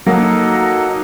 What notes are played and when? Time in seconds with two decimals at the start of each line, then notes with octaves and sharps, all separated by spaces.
0.06 F#3 A#3 D#4 A4 D#5 F#5
0.89 D#4